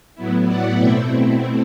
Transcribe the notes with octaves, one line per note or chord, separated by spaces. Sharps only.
A2 F#3 B3 E4
D5 F#5
B2 A3 C4 E4 E5 G5